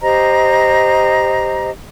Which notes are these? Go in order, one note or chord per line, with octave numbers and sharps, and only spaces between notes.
G4 C5 D#5 A#5